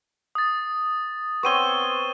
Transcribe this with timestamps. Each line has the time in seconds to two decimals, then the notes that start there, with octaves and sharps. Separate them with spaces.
0.35 D#6 A6
1.43 B3 C4 C#5 C#6 D#7 G7